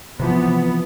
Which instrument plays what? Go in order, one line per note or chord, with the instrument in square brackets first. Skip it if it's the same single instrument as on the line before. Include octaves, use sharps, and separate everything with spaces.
[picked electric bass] C3 E3 F3 [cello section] B3